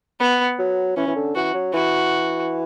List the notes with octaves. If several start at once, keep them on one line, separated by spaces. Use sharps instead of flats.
B3
F#3
E3 C#4
E3
D3
E3 F#4
F#3
E3 F#4